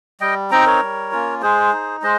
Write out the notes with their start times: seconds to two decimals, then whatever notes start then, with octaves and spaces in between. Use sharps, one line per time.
0.21 G3 D#5 G5
0.51 C4 D#4 G5 A#5
0.66 A#4 C#5
0.82 G3
1.12 A#3 C#4 F4
1.42 G#3 G#4 C5
1.73 D#4
2.02 G#3 C5 D#5